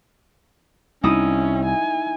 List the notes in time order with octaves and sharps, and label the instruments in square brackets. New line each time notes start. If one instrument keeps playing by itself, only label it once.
[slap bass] C2 [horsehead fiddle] C#4 [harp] D#4 E4 D#6
[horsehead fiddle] G#5